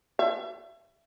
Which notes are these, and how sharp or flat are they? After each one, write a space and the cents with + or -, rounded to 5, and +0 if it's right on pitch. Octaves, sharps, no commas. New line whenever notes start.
E5 +30